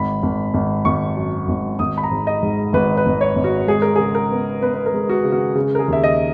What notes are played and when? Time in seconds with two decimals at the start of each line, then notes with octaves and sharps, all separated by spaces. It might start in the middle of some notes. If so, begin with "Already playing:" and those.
Already playing: G#1 B5
0.23 G#1
0.54 G#1
0.85 G#1 C#6
1.17 F#2
1.48 G#1
1.79 G#1 D#6
1.98 B5
2.03 A#5
2.11 G#2
2.27 D#5
2.43 G#2
2.73 G#1 B4
2.97 B4
3.06 G#1
3.21 C#5
3.36 G#1
3.44 F#4
3.68 G#3 G#4
3.82 A#4
3.96 C#3 G#4
4.15 A#4
4.31 B3
4.61 B3 B4
4.74 B4
4.86 A#4
4.94 G#3
5.09 F#4
5.24 C#3
5.32 F#4
5.55 C#3
5.75 A#4
5.79 G#4
5.88 D#2 E5
6.04 D#5